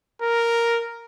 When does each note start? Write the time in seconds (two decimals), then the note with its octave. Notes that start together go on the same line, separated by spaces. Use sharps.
0.21 A#4